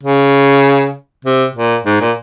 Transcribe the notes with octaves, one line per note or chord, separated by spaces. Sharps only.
C#3
C3
A#2
G#2
A#2